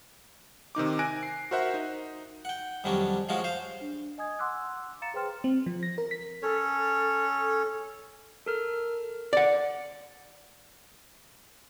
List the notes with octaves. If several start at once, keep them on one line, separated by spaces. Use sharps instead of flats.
C3 D#3 D#4 D6
G#5 F#6 A#6 D7
C7
F#4 A#4 C5 E5 F#5
D#4
F#5 G5
F2 D#3 F#3 G3 C#4 D4
F3 G#3 C#4 F4 F#4
C5 F5
D4
D#5 G#5 D#6 G#6
F#5 C6 D6 E6 F#6
F5 A#5 A6 C#7 E7
G#4 B4 C5 G5 C6 F6
C4
F3
A#6
A#4
B6
C#4 A4 C#5
A4 A#4 F6
D5 F#5